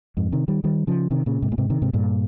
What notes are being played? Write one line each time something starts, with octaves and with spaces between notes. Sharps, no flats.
F2 G#2
C3 D#3
D#3 G3
D#3 G3
C#3 F3
C3 D#3
A#2 C#3
G#2 C3
A#2
G#2 C3
C3 D#3
G#2 C3
G2 A#2